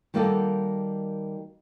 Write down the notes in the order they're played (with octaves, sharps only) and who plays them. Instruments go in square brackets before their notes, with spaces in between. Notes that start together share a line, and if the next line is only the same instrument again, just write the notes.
[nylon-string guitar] D#3 G3 A#3 F#4 G4 A4